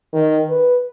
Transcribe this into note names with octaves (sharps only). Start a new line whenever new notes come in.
D#3
B4